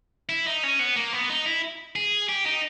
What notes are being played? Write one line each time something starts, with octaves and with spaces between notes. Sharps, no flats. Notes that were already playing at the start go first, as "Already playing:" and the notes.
E4
D#4
C#4
B3
A#3
B3
D#4
E4
G#4
G4
D#4